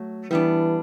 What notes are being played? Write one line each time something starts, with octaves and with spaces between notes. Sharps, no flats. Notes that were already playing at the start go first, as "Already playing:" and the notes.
Already playing: F#3 A3
E3 G3 B3 D4